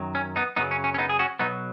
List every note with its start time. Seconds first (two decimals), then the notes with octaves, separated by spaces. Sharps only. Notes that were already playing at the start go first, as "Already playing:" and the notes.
Already playing: F#2 D#3 F#3
0.15 C#4
0.36 B3 D#4
0.56 F#2 C#3 F#3 B3 D#4
0.71 C#4
0.84 C#4
0.94 C#4
0.98 B3 D#4
1.09 G#4
1.19 C#4 F#4
1.39 B1 B2 F#3 B3 D#4